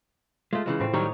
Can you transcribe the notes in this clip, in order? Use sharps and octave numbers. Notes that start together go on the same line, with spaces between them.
G#3 A3 F4
C#3 E3 G#3
A2 C4
D#3 F#3 G3 D#4 C#5